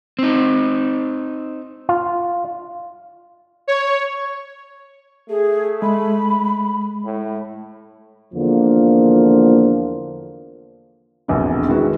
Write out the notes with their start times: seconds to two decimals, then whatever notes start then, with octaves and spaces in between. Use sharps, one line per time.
0.19 C4 D#4
1.89 F4
3.68 C#5
5.29 A3 G#4
5.82 G#3 B5
7.05 A2
8.34 E2 D3 F3 A#3
11.28 F1 A#1 E2 B2 D3
11.68 D#3 G#3 E4 F#4 B4